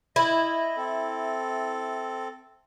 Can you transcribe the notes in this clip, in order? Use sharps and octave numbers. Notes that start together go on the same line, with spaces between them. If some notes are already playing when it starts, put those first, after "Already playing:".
E4 D#5
C4 A4